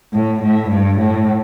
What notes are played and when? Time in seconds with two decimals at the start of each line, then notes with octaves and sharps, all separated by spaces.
0.13 A2
0.42 A2
0.70 G2
0.98 A2